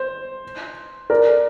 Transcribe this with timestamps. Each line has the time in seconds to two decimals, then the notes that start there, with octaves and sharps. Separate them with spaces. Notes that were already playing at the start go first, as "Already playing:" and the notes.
Already playing: C5
1.10 A#4 D5